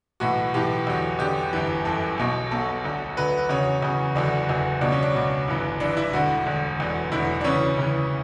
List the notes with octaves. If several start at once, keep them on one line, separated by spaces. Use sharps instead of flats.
B1 A2 E3 F#4
B1 A2 E3 G4
E2 D3 F#3
E2 D3 F#3 G4
G1 F#2 E3
G1 F#2 E3 A4
B1 B2 F#3
B1 B2 F#3 A4
D2 D3 F#3
D2 D3 F#3 B4
E2 C#3 F#3 C#5
E2 C#3 F#3
F#1 E2 D3 F#3 D4
F#1 E2 D3 F#3
C#2 B2 F#3 D4
C#4
D4
C#2 B2 F#3
G1 G2 E3
G1 G2 E3 D4
E4
E1 D2 D3 F#4
E1 D2 D3
E1 E2 D3 F#3
E1 E2 D3 F#3 E4
D4
D2 C#3 E3 C#4
D2 C#3 E3